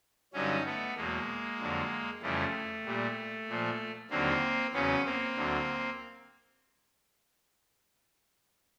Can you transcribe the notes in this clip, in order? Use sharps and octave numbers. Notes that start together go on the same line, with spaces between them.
G2 D3 F#3 C#4 D#4
A3 B3
E2 B2 F#3 G#3 A#3
F2 D3 F#3
F2 C#3 E3 G3 A3
A#2 G3
A#2 F3
D#2 D3 F#3 A#3 C4
E2 C#3 F#3 B3 C#4
A#3 C4
D2 D3 F#3